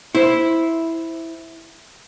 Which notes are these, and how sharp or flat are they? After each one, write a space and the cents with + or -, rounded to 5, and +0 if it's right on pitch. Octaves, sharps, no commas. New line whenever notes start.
E4 -5 C5 +0